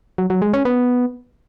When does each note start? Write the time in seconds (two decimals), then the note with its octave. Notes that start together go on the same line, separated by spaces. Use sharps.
0.18 F#3
0.30 F#3
0.42 G#3
0.53 C#4
0.65 B3